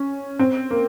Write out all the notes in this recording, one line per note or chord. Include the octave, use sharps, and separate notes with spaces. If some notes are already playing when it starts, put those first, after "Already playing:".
Already playing: C#4
C4
A#3